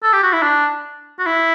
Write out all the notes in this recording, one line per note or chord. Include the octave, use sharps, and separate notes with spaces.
A4
G4
F#4
E4
D4
F#4
E4